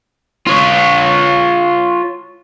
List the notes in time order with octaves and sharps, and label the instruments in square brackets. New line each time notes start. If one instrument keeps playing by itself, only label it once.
[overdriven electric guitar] F4 C#5